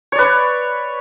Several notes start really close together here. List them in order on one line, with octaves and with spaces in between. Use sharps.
C#5 D5 B4